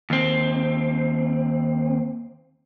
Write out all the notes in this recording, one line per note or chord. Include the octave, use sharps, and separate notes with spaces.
D#2 C4